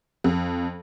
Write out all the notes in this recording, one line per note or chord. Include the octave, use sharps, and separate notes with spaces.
F2